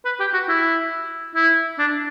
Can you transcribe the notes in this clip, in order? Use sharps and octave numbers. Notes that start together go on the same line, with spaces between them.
B4
G4
F#4
E4
E4
D4